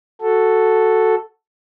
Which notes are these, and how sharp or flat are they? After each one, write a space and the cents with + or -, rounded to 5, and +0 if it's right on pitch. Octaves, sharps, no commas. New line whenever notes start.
F#4 +0 A4 +0